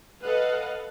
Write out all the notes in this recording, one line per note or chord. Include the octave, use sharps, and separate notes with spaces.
A4 B4 D#5 F5 F#5